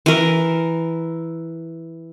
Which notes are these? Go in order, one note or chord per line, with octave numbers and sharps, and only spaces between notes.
E3 A#4